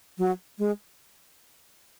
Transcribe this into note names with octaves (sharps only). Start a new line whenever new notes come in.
F#3
G#3